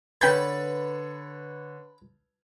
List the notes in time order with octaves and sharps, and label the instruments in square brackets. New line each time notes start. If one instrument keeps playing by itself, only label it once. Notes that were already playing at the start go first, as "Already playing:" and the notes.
[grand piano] D3 C#5 A6 [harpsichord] B4 [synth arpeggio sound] G5 B5 G6